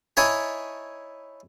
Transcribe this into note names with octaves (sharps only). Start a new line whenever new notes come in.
D#4 E4 C#5 G#5 A5